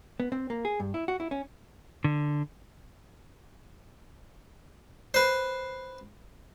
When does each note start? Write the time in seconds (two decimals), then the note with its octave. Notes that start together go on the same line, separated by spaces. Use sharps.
0.20 B3
0.32 C4
0.50 A#3
0.65 G#4
0.80 G2
0.94 E4
1.08 F#4
1.20 E4
1.31 C#4
2.04 D3
5.14 B4 C5